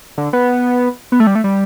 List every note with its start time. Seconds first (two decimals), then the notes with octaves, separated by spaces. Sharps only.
0.18 D3
0.33 B3
1.12 B3
1.20 A3
1.27 G3
1.35 A3
1.44 G3